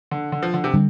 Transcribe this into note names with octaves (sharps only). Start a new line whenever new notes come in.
D3
D3
F3
D3
C3
D3 G3